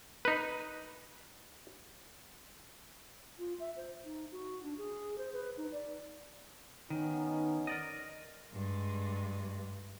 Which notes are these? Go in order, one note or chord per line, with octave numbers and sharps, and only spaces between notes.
D#4 B4
F4
E5
C5
D#4
F#4
D4
G#4
C5
B4
D#4
D5
D#3 B3 C#4 D#4
A#4 D5 D#5
G2 G#3